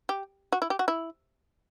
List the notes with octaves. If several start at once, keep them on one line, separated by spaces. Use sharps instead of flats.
G4
F#4
E4
G4
F#4
E4